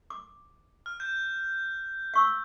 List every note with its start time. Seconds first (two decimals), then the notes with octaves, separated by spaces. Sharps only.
0.10 D6
0.86 F6
1.00 G6
2.14 F5 C#6 E6